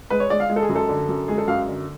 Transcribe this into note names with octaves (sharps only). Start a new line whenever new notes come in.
G#3 B4
C#5
G#3 D5
F5
G#3
A4
G#4
F#2
A4
D3
F#2
G#3 G#4
A4
F#2 F5
D3